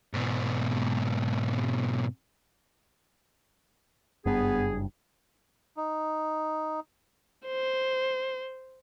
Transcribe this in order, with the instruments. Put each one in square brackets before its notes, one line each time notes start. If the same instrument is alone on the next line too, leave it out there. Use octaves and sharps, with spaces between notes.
[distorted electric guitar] G#2 B2
[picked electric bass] F#1 G2 [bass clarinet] B3 [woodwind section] G#4
[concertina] D#4
[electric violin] C5